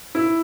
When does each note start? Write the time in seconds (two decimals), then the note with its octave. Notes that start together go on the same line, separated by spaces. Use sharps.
0.15 E4